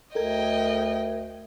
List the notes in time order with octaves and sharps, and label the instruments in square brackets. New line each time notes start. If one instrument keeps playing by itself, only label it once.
[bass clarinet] D2 [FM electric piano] A4 A#4 G#6 [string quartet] D#5 G5